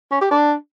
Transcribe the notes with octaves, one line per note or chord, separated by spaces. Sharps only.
C#4
G4
D4